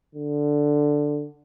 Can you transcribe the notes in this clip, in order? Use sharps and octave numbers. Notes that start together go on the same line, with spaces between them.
D3